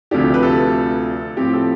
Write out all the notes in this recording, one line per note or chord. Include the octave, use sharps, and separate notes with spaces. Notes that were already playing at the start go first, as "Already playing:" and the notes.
D2 C3 F3 A3 D4 G4
B4
A4
A2 F3 C4 G4
A4